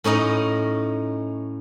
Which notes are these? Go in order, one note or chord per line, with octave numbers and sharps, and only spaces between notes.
A2 C#4 D#4 D#5 F#5